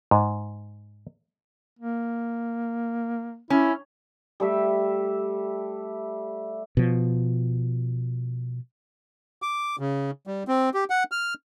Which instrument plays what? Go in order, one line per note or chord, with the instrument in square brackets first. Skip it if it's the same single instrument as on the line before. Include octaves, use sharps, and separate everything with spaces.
[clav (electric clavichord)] G#2
[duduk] A#3
[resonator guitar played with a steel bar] C#4 [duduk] E4
[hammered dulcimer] G3 A3 E5
[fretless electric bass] B2 F3
[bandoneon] D6
C#3
G3
C4
G4
F#5
F6